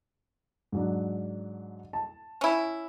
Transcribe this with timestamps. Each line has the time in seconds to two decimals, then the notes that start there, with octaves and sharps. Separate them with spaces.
0.72 G#2 F#3 D4
1.93 A5
2.41 C#4 E4